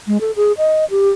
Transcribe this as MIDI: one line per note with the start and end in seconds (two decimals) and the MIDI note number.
0.07 0.18 56
0.21 0.31 69
0.36 0.52 68
0.58 0.85 75
0.91 1.09 67